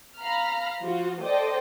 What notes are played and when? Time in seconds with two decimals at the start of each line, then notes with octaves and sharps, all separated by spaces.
0.19 F5 A#5 B5 F6
0.81 F3 F4 F#4
1.22 A4 C5 D5 D#5 G5